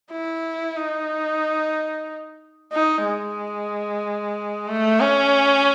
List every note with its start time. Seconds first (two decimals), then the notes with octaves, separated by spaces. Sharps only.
0.12 E4
0.77 D#4
2.72 D#4
3.05 G#3
4.68 A3
5.00 C#4